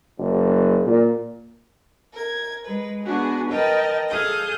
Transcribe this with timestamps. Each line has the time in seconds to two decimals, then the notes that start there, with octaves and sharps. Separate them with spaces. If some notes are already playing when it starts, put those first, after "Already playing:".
0.19 F#1
0.86 A#2
2.13 A#4 G#6
2.66 G#3 B4
3.03 B3 D4 F#4 G#4
3.50 A#4 B4 D#5 G5 A5
4.09 G#4 A4 F5 D#6 G6